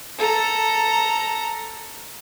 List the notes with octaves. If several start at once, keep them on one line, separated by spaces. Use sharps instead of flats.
A4 A#5